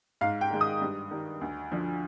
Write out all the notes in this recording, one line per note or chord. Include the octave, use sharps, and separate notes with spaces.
G#2 F5
G5
D#3 G#3
D#6
G2
D#3 G3
D2
D3 F3